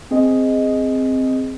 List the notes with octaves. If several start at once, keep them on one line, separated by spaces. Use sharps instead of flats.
C4 G#4 D#5